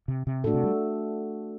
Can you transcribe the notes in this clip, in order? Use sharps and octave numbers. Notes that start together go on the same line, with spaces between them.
C3
C3
A2 A3 D4 F#4 A4
C3
G3